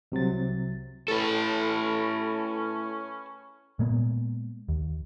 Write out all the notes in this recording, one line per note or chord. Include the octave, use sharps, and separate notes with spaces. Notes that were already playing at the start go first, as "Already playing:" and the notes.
C2 C3 F#3 A6
A2 C#4 A4 B4
A#2 G#3 A#3 B3
D#2